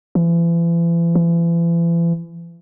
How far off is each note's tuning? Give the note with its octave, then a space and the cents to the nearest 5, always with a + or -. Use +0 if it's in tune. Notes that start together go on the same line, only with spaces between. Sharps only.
E3 +40
E3 +40